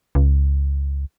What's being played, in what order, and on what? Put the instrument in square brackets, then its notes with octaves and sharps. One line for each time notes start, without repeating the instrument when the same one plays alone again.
[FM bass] C#2